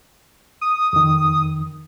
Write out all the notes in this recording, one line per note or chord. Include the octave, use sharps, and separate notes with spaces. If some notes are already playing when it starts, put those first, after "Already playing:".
D#6
F2 D#3